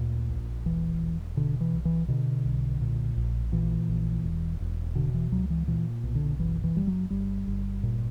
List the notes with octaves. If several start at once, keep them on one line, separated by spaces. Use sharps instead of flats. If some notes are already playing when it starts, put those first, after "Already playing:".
Already playing: D2 A#2
A#1
E1 E3
E1
B2 D3
E3
B1
E3
B2 D3
B1
A#2
A#1
A#2 E3
A#1
E1
E1
B2 D3
E3
C#2 F#3
E3
A#2 E3
B1
D3
F#1 E3
E3
F#1 G3
F#3
G1 G3
G1
A#2